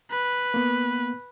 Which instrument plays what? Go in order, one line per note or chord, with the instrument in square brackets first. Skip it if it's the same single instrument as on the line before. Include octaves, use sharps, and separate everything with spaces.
[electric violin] B4
[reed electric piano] A#3 B3